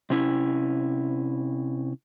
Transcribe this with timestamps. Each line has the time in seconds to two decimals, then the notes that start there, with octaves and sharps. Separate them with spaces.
0.10 C3 C#4 E4